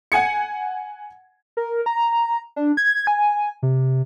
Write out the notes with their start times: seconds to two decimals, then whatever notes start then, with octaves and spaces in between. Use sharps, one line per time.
0.12 F#5 G#5 G#6 C#7
1.57 A#4
1.86 A#5
2.56 D4
2.77 G#6
3.07 G#5
3.63 C3